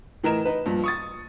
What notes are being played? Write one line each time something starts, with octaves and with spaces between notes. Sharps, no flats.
A2 E3 A#4 D#5 E7
D#4 B4
G2 A#2 F3
C#6 D#6 A6